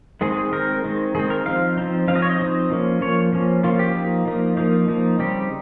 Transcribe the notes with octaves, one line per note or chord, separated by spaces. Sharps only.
D#3 G#3 C4 G#4
G#4
D#3 G#3 C4 A#4
D#3 G#3 C4
D#3 G#3 C4 G#4
A#4
F3 C4 D#4 F5
F3 C4 D#4
F3 C4 D#4 F5
D#5
C#5
D#5
F3 C4 D#4
F3 A#3 C#4
F3 A#3 C#4 C#5
F3 A#3 C#4
F3 A#3 C#4 F4
G4
F3 A#3 D#4
F3 A#3 D#4
F3 A#3 D#4
F3 A#3 D#4
C#3 G3 C4 D#4 G4